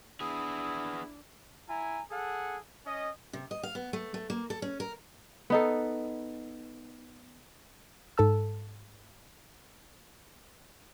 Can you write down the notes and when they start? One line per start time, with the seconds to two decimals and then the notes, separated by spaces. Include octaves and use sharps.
0.21 B3 D4 E4 G#4 D#6
1.67 E4 G#5 A#5
2.10 G#4 A4 F#5
2.86 C#4 D#5
3.33 C3
3.51 D#5
3.63 F5
3.75 B3
3.93 A3
4.14 A3
4.30 A#3
4.50 A4
4.62 C#4
4.80 A#4
5.50 B3 D#4 A4
8.18 G#2 A4 A5 E6